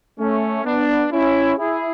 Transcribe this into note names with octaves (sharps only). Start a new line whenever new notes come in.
A3 C#4
B3 D4
C#4 E4
E4 G#4